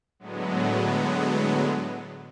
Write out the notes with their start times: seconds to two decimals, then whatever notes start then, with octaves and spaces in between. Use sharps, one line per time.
0.19 A2 D3 F#3 G#3 B3